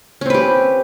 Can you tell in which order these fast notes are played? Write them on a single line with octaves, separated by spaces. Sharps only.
C#4 C4 B4 G4